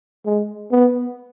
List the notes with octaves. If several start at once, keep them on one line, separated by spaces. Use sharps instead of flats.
G#3
B3